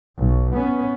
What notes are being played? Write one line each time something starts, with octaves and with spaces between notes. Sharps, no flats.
B1
B3 C#4